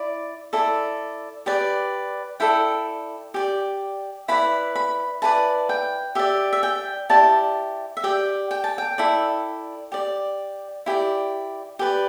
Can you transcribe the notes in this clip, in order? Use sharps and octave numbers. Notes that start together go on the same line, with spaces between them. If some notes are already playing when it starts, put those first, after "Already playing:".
Already playing: E4 D5
E4 A4 D5
G4 B4 D5
E4 A4 D5 G5
G4 D5
E4 B4 D5 B5
B5
E4 B4 D5 A5
G5
G4 D5 E5
E5
G5
E4 G4 D5 A5
E5
G4 D5 G5
G5
A5
G5
E4 A4 D5
G4 D5
E4 G4 D5
G4 B4 D5